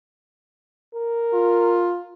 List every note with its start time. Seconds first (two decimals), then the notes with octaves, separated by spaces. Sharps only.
0.94 A#4
1.33 F4